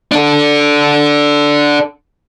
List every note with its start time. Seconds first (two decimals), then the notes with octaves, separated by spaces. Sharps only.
0.12 D4 A4